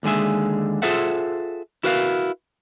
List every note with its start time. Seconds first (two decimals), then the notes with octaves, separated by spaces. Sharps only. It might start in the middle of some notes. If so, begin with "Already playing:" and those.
0.03 D#2 D3 G#3 G#4 E5
0.82 F4 G#4 A4 C5 E5 F#5
1.83 E4 F#4 A#4 B4 D#5 F5